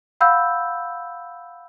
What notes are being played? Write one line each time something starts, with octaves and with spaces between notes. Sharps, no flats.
F5 F#5 B5 E6 G6